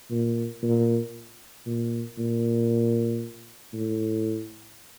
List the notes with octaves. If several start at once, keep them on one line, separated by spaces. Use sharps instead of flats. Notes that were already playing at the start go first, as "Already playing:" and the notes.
A#2
A#2
A#2
A#2
A2